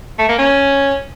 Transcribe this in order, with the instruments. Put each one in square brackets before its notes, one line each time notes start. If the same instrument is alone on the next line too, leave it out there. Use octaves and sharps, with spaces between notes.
[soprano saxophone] A3
A#3
C#4